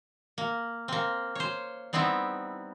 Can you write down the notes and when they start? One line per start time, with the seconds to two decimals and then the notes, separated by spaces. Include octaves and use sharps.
0.38 A#3
0.88 A#3 C4
1.35 C5 C#5
1.93 G3 B3 C4 D#4 E4